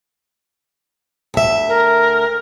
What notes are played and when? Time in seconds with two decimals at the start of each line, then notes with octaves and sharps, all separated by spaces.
1.34 D2 E5
1.68 A#4